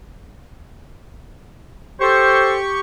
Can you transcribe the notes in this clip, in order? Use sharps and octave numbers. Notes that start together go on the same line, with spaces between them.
G4 A4 C5 C#6